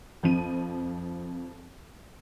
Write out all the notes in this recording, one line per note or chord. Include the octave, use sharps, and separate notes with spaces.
F2 F3 C4 D#7